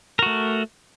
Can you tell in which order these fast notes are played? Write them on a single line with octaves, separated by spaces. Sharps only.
A#4 F#4 A3